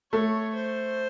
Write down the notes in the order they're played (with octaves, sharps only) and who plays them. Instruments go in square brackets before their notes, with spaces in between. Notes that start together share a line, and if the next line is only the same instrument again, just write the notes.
[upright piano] A3 [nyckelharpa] C#5
[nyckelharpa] C5